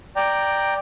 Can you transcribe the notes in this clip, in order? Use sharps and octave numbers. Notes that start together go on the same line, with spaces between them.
D5 G5 A#5